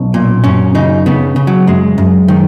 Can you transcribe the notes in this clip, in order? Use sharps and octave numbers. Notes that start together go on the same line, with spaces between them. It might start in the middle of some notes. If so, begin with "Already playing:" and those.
Already playing: B1 C#4
A#2
F#2 C#4
C#3 D#4
C#3 B3
C#3
F#3
F#2 G#3
F#2
D#3